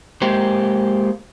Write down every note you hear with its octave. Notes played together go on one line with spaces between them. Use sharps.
G#3 A#3 G4 C5